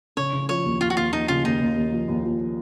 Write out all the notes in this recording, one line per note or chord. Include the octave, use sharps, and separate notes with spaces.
C#3 C#5
C#3
F3 C#5
D#2
D#2 F4
F#4
D#2 F4
D#2 D#4
C#3 F4
D#2 D#4
D#2
D#2
F3
D#2
F3